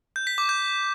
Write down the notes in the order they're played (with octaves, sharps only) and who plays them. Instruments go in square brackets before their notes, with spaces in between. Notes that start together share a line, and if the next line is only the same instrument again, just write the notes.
[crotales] G6
B6
D6
G6